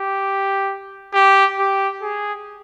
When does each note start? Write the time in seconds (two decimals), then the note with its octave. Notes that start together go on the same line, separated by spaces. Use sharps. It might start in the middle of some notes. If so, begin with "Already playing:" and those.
Already playing: G4
1.14 G4
1.59 G4
2.02 G#4